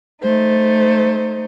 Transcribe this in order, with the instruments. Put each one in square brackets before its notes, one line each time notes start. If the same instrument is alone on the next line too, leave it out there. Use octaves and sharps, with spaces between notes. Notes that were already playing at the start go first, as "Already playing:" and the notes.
[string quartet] A3 D#4 C5